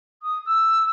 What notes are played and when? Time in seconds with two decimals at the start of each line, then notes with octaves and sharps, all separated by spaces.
0.23 D#6
0.46 E6